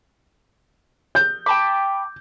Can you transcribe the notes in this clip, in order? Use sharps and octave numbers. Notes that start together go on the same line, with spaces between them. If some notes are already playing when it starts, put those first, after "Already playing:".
G6
G5 A5 B5 D6